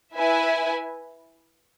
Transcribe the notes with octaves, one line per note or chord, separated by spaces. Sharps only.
E4 B4 E5 G#5